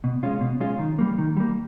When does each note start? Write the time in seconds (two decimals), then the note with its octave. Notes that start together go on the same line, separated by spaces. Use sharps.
0.04 B2
0.23 G#3 C#4 F4
0.41 B2
0.60 G#3 C#4 F4
0.79 D#3
0.99 G3 A#3
1.18 D#3
1.37 G3 A#3